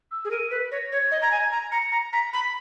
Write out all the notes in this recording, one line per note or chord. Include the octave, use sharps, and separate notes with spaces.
E6
G#4
A#4 D#7
B4 B6
C#5 A#6
C#5 G#6
D#5
A#5
G#5
A#5
A#5 C#7
A#5
A#5 B6
B5